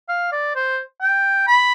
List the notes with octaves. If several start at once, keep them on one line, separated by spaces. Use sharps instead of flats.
F5
D5
C5
G5
B5